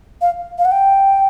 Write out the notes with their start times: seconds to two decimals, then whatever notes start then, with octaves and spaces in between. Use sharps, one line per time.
0.21 F5
0.59 F5
0.65 F#5
0.72 G5